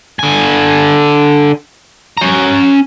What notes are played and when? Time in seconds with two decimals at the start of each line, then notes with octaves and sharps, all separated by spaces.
0.19 D3 G#5
2.17 C#4 A#5